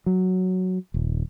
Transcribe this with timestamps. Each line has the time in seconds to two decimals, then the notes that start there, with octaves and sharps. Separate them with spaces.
0.06 F#3
0.94 D#1